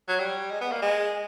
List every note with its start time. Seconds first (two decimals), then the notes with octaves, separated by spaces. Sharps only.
0.08 F#3
0.19 G3
0.51 G#3
0.61 B3
0.72 A#3
0.82 G#3